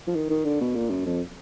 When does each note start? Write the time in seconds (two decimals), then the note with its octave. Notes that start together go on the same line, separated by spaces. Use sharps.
0.07 F3
0.16 D#3
0.30 D#3
0.45 D3
0.61 B2
0.75 A#2
0.90 F#2
1.06 F2